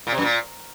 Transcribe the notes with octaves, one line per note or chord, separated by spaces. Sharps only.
A#2
C3
F#2
A#2